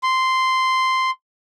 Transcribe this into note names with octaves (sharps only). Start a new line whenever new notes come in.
C6